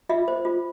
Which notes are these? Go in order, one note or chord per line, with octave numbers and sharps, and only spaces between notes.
F4 E5
C5
F4